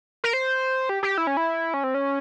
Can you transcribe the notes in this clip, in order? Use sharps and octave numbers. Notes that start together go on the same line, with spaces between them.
A#4
C5
G4
G4
E4
C#4
E4
C#4
C4
C#4